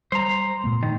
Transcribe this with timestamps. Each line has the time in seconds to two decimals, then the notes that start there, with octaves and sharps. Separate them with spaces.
0.12 G3 C5 A#5
0.64 A#2 A3 B3
0.83 D#3